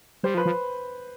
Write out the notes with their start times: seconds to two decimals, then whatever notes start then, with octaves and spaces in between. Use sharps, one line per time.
0.23 G3 C5
0.34 F3
0.37 B4
0.46 F3